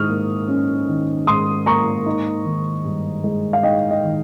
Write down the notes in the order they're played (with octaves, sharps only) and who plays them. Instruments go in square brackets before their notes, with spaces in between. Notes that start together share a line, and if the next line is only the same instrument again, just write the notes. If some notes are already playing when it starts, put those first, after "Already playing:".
Already playing: [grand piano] G#2 D#3 C#6 D#6 F6
A#3
C#4
D#3
G#2 C6 D#6
A#3 A#5 C#6
D#4
D#3
G2
G#3
F5
D#4 D#5 G5
D#5
D#3